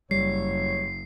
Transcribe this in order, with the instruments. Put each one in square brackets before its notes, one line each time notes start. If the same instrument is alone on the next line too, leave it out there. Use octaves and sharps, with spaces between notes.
[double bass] F#1 [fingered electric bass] G3 [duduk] C#5 [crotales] C7